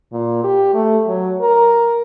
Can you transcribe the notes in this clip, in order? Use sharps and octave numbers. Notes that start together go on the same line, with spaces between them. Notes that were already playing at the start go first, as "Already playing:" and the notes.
A#2
G4
A3
F#3
A#4